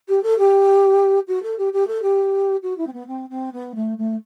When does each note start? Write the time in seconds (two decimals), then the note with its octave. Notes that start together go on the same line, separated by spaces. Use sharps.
0.08 G4
0.23 A4
0.38 G4
1.28 F#4
1.43 A4
1.58 G4
1.73 G4
1.87 A4
2.02 G4
2.62 F#4
2.78 E4
2.87 C4
2.93 B3
3.07 C4
3.29 C4
3.52 B3
3.75 A3
3.97 A3